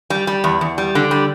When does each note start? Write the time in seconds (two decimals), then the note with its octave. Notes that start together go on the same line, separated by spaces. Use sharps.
0.10 G3
0.27 G3
0.44 E2
0.61 E2
0.78 G3
0.95 D3
1.11 G3